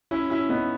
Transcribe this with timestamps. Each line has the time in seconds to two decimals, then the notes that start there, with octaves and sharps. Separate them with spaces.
0.11 C#4 E4
0.30 C#4 E4
0.49 B3 D#4